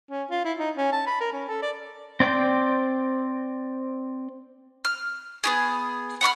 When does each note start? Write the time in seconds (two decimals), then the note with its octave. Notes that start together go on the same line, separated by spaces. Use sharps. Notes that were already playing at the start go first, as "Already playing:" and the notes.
0.10 C#4
0.31 F4
0.44 E4
0.58 D#4
0.77 C#4
0.92 A5
1.07 B5
1.20 A#4
1.33 C#4
1.48 A4
1.62 D5
2.20 C4 D5 G5 C6
4.85 F6
5.44 B3 G4 G#4
6.21 F#5 B5 C#6 F6